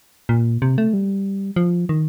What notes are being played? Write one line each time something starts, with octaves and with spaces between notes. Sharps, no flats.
A#2
C3
A3
G3
F3
D#3